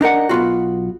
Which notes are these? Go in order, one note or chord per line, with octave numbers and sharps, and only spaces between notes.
D4 D#4 A#4 F#5
B1 B3 F4 F#4